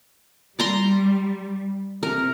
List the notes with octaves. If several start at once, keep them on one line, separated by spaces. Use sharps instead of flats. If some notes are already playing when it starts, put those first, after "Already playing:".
G3 D5 A#5 C6
C3 A#4